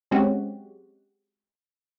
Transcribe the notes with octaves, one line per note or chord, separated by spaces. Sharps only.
F#3 G#3 C4 C#4 F#4 G4